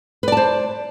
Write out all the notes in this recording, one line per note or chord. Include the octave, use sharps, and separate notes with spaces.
B4 C5 D5 A5